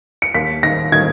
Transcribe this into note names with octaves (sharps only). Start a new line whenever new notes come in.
C#7
D#2 B6
D#3 A#6
D#3 G#6